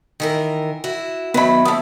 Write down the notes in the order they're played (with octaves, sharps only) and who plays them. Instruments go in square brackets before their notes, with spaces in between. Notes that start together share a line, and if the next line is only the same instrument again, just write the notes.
[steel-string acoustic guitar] D#3 E3 A#4
E4 F#4
[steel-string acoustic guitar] D#3 F#3 [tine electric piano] B3 E5 [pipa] B4 B5
[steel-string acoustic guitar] D#2 E3 [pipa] B3 A4 [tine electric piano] D#6